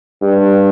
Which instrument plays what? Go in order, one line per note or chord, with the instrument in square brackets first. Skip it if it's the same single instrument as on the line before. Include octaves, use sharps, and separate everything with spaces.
[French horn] G2